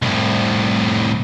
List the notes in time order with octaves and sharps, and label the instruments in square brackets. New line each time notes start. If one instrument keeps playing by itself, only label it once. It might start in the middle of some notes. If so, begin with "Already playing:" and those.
[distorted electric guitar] C2 A2